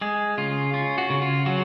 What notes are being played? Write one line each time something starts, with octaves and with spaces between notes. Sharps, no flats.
G#3 G#4
C#3 F4
C#4 F4
F#4
C#3
F4
F#3 F#4